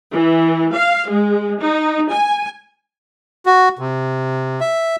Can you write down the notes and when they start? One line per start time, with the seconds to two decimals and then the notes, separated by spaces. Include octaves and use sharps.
0.12 E3
0.74 F5
1.07 G#3
1.59 D#4
2.11 G#5
3.46 F#4
3.79 C3
4.61 E5